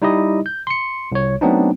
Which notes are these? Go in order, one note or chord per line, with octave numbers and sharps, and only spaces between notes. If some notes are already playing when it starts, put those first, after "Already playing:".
G3 D#4 E4 G4 D#5
G6
C6 C#7
C2 C#5
F#3 A3 B3 C4 D4 D#4